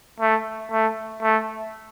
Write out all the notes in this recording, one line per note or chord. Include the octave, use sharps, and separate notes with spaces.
A3
A3
A3